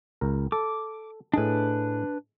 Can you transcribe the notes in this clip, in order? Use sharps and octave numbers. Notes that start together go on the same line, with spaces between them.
C#2 A#4
A4 D6
A2 D4 G#4 B4 D#5